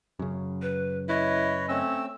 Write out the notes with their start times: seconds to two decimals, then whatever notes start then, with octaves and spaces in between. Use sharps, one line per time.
0.19 F#2 C#3
0.62 B4
1.09 E4 B4 C#5 D#5
1.69 A3 C4 C#4 E6